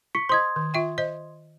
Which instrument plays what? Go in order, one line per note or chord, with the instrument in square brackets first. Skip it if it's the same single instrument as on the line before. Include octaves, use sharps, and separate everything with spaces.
[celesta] C#6 B6 C#7
[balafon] C5 D#5 [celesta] C6 D#6 G#6
[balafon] D#3
F4 E5 G5
C5 D#5